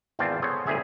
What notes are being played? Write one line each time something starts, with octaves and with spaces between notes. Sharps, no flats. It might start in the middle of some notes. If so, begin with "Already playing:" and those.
G#1 E2 C4 F4 D5 A5
B3 G#4 A4 C5 C#5
G1 D2 G4 G#4 E5